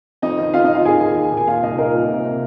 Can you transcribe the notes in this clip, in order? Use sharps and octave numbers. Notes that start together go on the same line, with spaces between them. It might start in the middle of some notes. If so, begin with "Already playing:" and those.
F2 D#4 D#5
D#3
D#3 F4 F5
D#4 D#5
D#3
F4 F5
D#2 G#4 G#5
D#2
D#3
D#2
G#5
A#2 F4 F5
C2 D#4 D#5
A#2 A#4
A#2
C3
C3